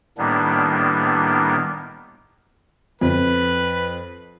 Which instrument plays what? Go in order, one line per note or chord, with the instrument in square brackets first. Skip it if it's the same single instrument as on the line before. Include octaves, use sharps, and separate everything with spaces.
[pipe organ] A2 D#3 G3 A#3 B3 D4
[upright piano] F2 [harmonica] B4